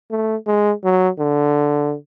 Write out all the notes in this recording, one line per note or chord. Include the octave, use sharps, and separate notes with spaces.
A3
G#3
F#3
D3